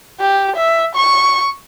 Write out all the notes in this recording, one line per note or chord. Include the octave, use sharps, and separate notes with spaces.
G4
E5
C#6